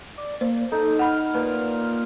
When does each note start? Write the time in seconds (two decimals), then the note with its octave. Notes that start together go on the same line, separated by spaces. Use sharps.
0.18 D5
0.41 A#3 C5
0.72 D#4 A4
0.99 F#5 B5 F6
1.34 A#2 B4